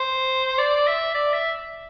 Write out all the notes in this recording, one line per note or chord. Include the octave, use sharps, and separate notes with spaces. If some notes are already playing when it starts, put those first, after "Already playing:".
Already playing: C5
D5
E5
D5
E5